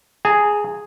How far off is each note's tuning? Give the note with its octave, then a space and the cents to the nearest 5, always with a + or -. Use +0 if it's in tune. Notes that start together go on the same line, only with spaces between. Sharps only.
G#4 +0 A#5 -40